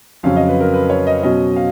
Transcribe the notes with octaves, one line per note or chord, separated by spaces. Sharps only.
F2 C#3 F#3 C#4 F5
D#5
B4
A#4
B4
C#5
D#5
B2 F#3 C#4 D#5
F5